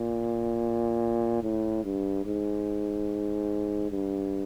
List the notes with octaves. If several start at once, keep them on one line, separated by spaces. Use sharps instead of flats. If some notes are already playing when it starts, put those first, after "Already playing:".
Already playing: A#2
A2
G2
G#2
G2